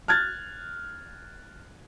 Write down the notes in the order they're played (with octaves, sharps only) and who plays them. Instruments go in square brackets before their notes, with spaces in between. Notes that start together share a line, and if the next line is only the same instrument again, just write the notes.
[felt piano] F6 F#6 G#6 A6